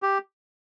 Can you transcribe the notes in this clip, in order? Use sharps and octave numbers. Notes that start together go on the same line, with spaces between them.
G4